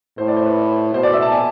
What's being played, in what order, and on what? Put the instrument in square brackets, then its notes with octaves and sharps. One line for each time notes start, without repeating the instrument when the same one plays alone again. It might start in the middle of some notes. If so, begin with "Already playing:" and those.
[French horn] A2 [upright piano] C5
[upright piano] D5
C5
B4
[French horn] B2 [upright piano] C5
[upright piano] D5
E5
A5
G#5